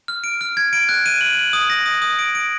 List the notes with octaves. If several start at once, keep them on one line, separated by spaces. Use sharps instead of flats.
F6
D7
F6
G#6
D7
F#6
D#7
F#7
F#7
D#6
A#6
D#6
D#6
D7
D7